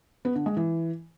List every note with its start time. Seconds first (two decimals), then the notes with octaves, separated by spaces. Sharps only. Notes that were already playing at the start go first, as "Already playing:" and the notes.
0.25 B3
0.35 D3
0.46 G#3
0.57 E3